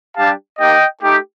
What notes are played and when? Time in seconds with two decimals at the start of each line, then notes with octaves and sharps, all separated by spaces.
0.16 G3 D4 G4 F5 A5
0.59 A#3 D#4 G4 D#5 G5
1.02 A3 D#4 G4